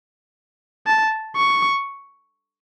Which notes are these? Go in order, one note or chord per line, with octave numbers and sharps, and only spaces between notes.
A5
C#6